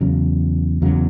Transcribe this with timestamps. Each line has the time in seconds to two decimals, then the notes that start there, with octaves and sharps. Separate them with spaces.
0.01 E2 C#3 F#3
0.82 E2 C#3 F#3